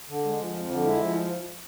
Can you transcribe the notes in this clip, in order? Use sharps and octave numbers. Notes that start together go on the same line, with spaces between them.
D3
G#3
F3
F2
D3
G#3 E4
F3